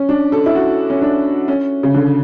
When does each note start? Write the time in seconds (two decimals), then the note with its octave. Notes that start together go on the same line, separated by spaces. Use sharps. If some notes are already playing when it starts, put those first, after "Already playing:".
Already playing: C#4
0.09 D4
0.32 A4
0.46 E4
0.55 F#4
0.90 C#4
1.02 D4
1.48 C#4
1.83 C#3
1.94 D3